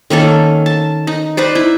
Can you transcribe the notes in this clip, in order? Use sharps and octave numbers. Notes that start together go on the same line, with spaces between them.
D#3 A#3 C#4 A4
A5
D#4
D#4 B4 C5 D5
E4